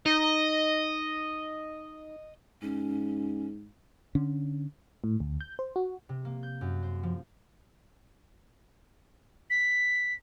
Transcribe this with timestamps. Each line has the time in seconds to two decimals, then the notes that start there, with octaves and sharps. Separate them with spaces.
0.06 D#4 D#5
2.62 G#2 C#4
4.15 D3 C#4 D4
5.04 A2
5.20 D2
5.41 G6
5.59 C5
5.76 F#4
6.09 C3
6.25 A#3
6.43 G6
6.61 F#2
6.83 C5
7.03 F3
9.50 B6